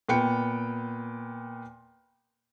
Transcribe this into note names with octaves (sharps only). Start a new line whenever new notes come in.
A#2 B3 G5 C#7